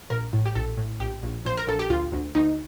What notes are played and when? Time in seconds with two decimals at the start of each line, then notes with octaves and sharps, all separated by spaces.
0.10 A#1 A#4
0.33 A2
0.45 G4
0.55 A#1 A4
0.77 A2
1.00 A#1 G4
1.23 A#1
1.45 A#1 C5
1.57 A#4
1.67 A#1 A4
1.79 G4
1.90 D2 F4
2.12 D2
2.35 D2 D#4